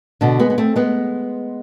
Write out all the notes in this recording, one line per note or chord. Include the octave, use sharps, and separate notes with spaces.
B2 D3
G#3 B3
B3
A3 C4
G#3 B3